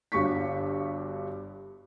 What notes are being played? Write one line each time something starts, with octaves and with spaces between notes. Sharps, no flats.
G1 G2 F#4 C#6 B6